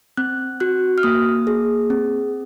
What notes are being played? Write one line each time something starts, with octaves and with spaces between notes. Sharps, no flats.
C4 F#6
F#4 F#6
F6
A#3 D#6
G#4
C4